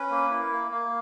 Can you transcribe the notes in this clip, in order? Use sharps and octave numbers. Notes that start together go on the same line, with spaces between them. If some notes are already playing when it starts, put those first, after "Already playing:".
Already playing: C#4 B4
A#3
E4
A#3
A#3